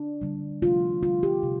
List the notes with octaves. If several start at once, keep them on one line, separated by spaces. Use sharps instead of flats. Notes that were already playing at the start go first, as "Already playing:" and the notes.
Already playing: D4
D3 G3
C3 F3 A3 F4
D3 G3 F4
G4
C3